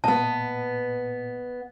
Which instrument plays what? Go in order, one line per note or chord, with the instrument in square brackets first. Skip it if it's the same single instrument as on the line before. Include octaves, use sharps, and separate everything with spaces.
[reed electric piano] A#2 [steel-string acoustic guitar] B3 D#5 [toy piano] A5